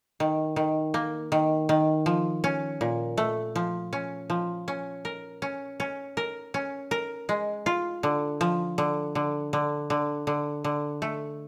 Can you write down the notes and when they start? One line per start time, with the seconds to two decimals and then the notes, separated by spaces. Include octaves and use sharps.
0.20 D#3
0.56 D#3
0.94 A#3
1.32 D#3
1.69 D#3
2.06 F3
2.44 C#4
2.81 A#2
3.18 A3
3.56 F3
3.93 C#4
4.30 F3
4.68 C#4
5.05 A#4
5.42 C#4
5.80 C#4
6.17 A#4
6.54 C#4
6.91 A#4
7.29 G#3
7.66 F4
8.03 D3
8.41 F3
8.78 D3
9.15 D3
9.53 D3
9.90 D3
10.27 D3
10.64 D3
11.02 A3